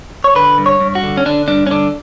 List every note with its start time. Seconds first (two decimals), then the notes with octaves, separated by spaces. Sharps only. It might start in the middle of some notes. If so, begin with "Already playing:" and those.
0.24 C#5
0.35 D3 B4
0.58 G2
0.66 C#5
0.81 G2
0.95 F#4
1.03 D3
1.17 C#4
1.26 D3 D4
1.48 G2 D4
1.67 C#4
1.71 D3 D4